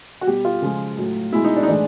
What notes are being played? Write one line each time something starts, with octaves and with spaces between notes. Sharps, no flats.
F#4
B2 G3 G4
F4
C#3 F3 G#3
A2 F#3
B2 G#3 E4
D#4
D4
D#4
A2 E3 G#3 D4